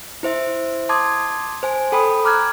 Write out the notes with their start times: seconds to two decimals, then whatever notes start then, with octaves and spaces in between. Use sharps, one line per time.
0.23 E4 C5 E5
0.89 A5 C6 D6 D#6 G#6
1.63 C5 G#5
1.92 A4 G5 B5 D#6
2.24 A#5 D6 F6 F#6 G#6